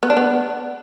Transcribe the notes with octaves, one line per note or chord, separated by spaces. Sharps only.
B3
D4
B3